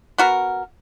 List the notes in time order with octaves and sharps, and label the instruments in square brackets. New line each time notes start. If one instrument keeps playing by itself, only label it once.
[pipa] B3 F#4 A#4